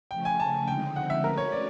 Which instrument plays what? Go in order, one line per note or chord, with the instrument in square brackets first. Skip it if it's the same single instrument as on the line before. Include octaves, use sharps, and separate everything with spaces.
[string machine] C#3 F3 A3 C#4 [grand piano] G5
[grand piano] G#5
A5
[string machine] D3 F3 G#3 C4 D#4 [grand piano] G5
[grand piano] F#5
E5
[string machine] A3 C#4 F#4 B4 [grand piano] A#4
[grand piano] C#5
D5